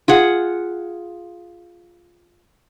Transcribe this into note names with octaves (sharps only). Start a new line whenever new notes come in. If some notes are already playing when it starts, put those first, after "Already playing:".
F4 G#4 F#5